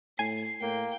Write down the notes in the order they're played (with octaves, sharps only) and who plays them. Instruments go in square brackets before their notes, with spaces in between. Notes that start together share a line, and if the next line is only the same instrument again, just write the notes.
[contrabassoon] A2 [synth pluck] G#5 [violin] C7
[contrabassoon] A2 [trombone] A#3 [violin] G5